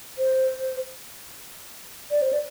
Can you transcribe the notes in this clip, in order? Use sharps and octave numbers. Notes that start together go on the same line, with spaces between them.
C5
D5
C5
D5